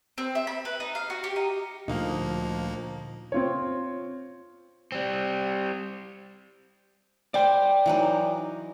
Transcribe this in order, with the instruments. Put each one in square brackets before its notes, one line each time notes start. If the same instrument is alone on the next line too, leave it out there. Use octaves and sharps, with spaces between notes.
[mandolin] C4
E5
B5
B4
D#4
F5
F#4
G4
D#4
[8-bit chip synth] D2 A#3 [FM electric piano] A#2 D3 [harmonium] F3 [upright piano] D#4 F5
[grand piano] C4 F4 C#5
[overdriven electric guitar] G3 C4
[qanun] C5 C6 [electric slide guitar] D5 G5
[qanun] E3 F#3 D#4